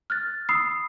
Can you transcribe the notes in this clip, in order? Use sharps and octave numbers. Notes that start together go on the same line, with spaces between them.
F6 F#6 A6
B5 D#6 E6 C7